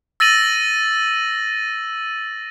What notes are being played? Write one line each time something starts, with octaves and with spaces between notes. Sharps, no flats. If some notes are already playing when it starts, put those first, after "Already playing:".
E6 A6 A#6 D#7 F#7